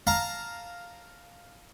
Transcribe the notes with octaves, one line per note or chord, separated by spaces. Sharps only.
F5 A5 A#5